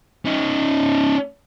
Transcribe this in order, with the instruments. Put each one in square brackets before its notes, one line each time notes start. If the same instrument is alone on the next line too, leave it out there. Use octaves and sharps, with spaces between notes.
[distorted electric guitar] C#4 D#4